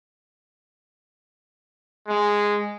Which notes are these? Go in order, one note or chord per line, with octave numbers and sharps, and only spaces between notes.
G#3